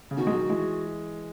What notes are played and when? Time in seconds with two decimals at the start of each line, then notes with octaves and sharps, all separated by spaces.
0.11 C#3
0.17 B2 D#3 F#4
0.27 G#3
0.33 D#3 F#3
0.49 E3 G#3